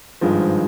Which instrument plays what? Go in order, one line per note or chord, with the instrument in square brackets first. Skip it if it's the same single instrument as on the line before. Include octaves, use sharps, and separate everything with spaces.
[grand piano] G#1 G2 F3 G#3